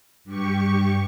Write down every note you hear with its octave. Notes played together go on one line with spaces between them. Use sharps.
G2 G4 C#6